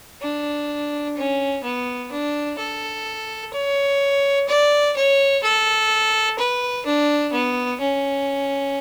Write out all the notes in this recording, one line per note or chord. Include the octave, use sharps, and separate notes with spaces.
D4
C#4
B3
D4
A4
C#5
D5
C#5
A4
B4
D4
B3
C#4